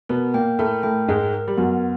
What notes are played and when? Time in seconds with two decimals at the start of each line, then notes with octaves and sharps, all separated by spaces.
0.09 B2 B3 A#4
0.34 A#2 A#3 G5
0.59 A2 A3 A#4
0.83 A2 A3 G5
1.08 G#2 G#3 A#4
1.34 A#4
1.48 G3
1.57 F#2 F#3 B3